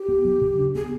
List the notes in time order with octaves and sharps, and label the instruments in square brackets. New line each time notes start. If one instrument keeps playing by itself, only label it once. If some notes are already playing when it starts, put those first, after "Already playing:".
Already playing: [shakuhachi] G4
[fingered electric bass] B3
F#3
C#3
D4
[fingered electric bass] B3 [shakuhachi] G#4